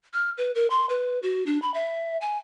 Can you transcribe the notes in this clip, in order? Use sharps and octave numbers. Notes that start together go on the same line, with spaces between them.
F6
B4
A#4
C6
B4
F#4
D4
B5
E5
G#5